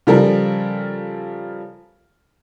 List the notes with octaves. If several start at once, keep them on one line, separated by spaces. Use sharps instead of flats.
C#3 F3 G3 A4 A#4